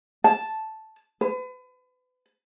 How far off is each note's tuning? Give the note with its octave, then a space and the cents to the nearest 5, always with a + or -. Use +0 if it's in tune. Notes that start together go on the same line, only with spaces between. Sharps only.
A5 -5
B4 +35